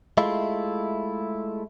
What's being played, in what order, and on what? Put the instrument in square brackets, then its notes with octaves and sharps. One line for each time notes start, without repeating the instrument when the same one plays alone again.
[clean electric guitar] G#3 A3 E4 F4